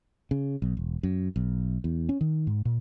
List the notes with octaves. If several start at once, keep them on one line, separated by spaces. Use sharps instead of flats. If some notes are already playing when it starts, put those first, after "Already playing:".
C#3
B1
E1
F#2
B1
E2
C#4
D#3
G#2
A#2